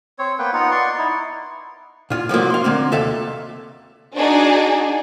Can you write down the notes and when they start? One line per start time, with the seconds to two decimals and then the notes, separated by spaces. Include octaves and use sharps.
0.19 C4 C#5
0.39 A#3 B3 B4 G5
0.53 B3 D#4 F4 F#5
0.71 D5 F#5 C6 C#6
0.98 D#4 E4
2.10 A#2 F4
2.29 C2 F3 F#3 A#3
2.50 F5 C6
2.64 D3 A#3 C4
2.92 D#2 C3 A4 E5 F5
4.15 D4 D#4 F#4 G#4 D5